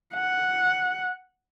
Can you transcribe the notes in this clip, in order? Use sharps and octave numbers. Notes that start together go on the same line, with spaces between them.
F#5